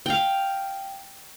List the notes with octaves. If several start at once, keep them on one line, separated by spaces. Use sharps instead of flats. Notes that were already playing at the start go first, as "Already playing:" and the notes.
F5 G5